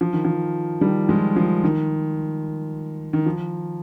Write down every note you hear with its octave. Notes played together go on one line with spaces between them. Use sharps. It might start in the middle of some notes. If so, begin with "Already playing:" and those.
F3
D#3
F3
D#3 G3
F3 G#3
F3
D#3
D#3
F3